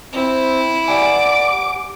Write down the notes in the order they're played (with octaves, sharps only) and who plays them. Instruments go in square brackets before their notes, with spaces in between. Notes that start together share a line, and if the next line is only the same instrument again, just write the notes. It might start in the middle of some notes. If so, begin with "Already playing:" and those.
[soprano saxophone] C4 [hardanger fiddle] E4
[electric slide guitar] G4 F#5 G#5 [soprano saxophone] D5 [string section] D6